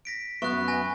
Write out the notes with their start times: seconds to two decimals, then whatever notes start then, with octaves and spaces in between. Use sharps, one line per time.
0.05 A#6 B6 D7
0.42 F#2 B3 E5 C#6 F#6
0.68 G#5 A#6